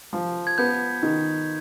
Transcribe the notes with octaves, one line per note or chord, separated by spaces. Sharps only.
F3
G#6
B3 G6
D#3